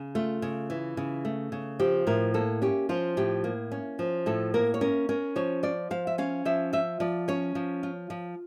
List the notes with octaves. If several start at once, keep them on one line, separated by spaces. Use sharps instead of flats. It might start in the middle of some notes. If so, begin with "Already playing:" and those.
Already playing: C#3
A3 F4
C#3
E3
C#3
A3
C#3
F3 G4
A2 A#4
A#3 A4
C#4 G4
F3 F4
A2 G4
A#3
C#4
F3
A2 A4
A#3 A#4
C#5
C#4 A#4
C#4 A#4
F3 C#5
F4 D5
F3 F5
E5
C#4 F5
F3 E5
F4 E5
F3 D5
C#4 C#5
F3
F4
F3